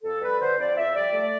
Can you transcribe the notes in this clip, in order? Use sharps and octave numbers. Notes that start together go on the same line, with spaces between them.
F2 A4
G3 B4
D3 C5
F2 D5
F2 E5
G3 D5
A3 D5